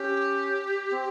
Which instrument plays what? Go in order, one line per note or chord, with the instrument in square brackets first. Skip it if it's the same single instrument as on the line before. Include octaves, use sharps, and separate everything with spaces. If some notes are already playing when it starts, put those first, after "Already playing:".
Already playing: [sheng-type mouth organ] C#4 [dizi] G4
[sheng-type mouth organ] C4